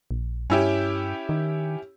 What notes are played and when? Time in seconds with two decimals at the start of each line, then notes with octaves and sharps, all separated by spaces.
0.11 A#1
0.50 G2 C#4 E4 G4
1.29 D#3